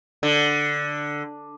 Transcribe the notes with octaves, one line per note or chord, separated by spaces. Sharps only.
D3